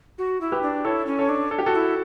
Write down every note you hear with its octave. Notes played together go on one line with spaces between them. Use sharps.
F#4
E4
G4 B4
D4
E4 A4 C#5
C#4
A4 C#5
D4
A4
G4
F#4 A4
E4